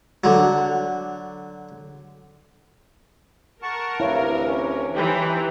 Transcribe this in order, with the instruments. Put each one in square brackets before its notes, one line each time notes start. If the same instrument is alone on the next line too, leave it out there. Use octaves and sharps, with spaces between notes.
[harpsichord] D3 F#3
[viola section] A#4 [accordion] F#5 A5 C#6
[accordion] D2 C3 E3 [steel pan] E4 C#5 F5
[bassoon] C#4
[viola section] E3 [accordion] D#4 C5 [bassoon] G4